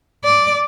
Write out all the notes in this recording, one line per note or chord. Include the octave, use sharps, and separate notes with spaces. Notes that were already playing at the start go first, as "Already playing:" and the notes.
D5